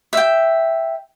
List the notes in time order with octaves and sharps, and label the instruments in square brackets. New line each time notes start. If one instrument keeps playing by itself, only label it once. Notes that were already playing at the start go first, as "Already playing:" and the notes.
[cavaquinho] E5 G5